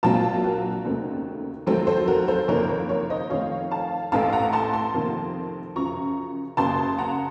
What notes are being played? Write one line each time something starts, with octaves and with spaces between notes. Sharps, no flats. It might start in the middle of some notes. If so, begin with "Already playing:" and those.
A#1 A#2 F#3 C4 F5 A5
F#4 A#4
F1 D#2 C#3 A3 C4
F2 D#3 F#3 A3 C4 A4 C5
A4 C5
F#4 A#4
A4 C5
F#1 F2 D#3 A#3 A#4 C#5
A#4 C#5
A#4 C#5
C5 D#5
F2 D#3 A3 C4 C#5 F5
F5 A5
A1 A2 A3 C4 F5 A5
F#5 A#5
A5 C6
A5 C6
F2 C3 D#3 A#3
F#2 C#3 F3 A#5 C#6
F#1 F#2 C#3 A5 C6
F#5 A#5